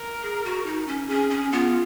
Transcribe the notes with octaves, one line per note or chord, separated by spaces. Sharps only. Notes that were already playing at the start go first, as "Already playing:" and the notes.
Already playing: A#4
G#4
F#4
D#4
C#4
C#4 G#4
C#4
B3 F4